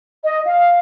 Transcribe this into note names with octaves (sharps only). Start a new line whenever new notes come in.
D#5
F5